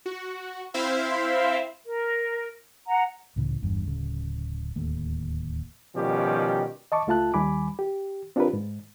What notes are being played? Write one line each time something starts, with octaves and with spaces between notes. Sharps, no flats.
F#4
C4 E4 C5 E5 F5
A#4
F#5 A#5
C#2 A2 C#3 E3
G1 E2 G2
D1 C#3
D1 D#2 A3
B2 D#3 F3 G3 C#4 G4
D#5 A5 C#6 D6
C#2 A3 F4 E5 A5 F#6
D#2 D#3 G3 G#5 B5 D6
G4
C4 D4 F4 G4 A#4 B4
G#2